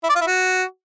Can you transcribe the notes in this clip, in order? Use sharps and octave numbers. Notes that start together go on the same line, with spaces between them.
E4
D5
F4
E4
F#4